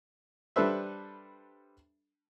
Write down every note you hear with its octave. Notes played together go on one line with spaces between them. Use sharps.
G3 D4 A4 B4 C5 E5